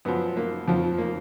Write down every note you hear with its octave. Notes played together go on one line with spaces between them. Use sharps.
F#2 F3 B3
A#3
F2 F3
A#3